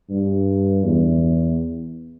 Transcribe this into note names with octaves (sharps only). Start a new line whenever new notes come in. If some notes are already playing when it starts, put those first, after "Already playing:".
G2
E2